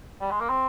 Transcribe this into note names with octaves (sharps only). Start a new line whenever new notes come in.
G3
G#3
A#3
C4